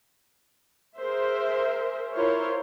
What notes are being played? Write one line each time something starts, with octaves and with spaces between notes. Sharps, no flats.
G#4 A#4 C5 E5
E4 F4 A#4 C5 C#5